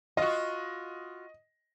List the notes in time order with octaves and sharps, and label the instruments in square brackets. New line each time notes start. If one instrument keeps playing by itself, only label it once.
[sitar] F4 F#4 [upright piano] D#5